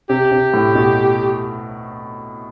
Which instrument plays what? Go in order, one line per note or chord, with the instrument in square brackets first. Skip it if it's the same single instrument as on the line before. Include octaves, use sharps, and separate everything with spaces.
[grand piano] C3 [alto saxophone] G4
[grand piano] C3
A2
B2